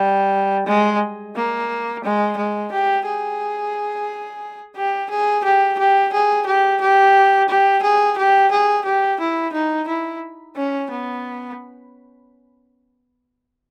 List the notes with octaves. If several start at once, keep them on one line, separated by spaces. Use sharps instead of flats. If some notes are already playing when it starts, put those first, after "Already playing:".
Already playing: G3
G#3
A#3
G#3
G#3
G4
G#4
G4
G#4
G4
G4
G#4
G4
G4
G4
G#4
G4
G#4
G4
E4
D#4
E4
C#4
B3